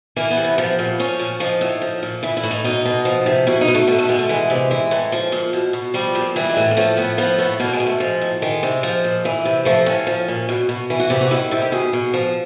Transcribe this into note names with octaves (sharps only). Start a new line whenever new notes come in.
E3 A#3
B3
C3
B3
F3 B3
A#2
F3 C#4
A#2
F3 D#4
A2
F3
A#2
E3 E4
E4
A2
D#4
B2 D#4
B2
F3
C3
B2 E4
D#4
B2
A3
B2 A3
A3
B2 G#3
A3
E3 G#3
C3
E3
A2
F3
A#2
B2
B2
F3 G3
A#2
E3 G3
G#3
A2
A#3
F3 A3
A2 B3
F3 B3
A2 B3
B2 A#3
G#3
B2
A3
F3 G#3
A2
D#3 G#3
C3
F3
A#2
E3
C3
F3 A3
A2 C#4
F3
A#2
B2
B2
E3
F#4
C3 G4
F#4
D#3 E4
C3 E4
G4
B2 G#4
B2
F3